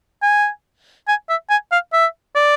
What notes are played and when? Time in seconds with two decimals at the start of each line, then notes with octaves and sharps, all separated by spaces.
0.22 G#5
1.08 G#5
1.29 E5
1.50 G#5
1.72 F5
1.93 E5
2.36 D5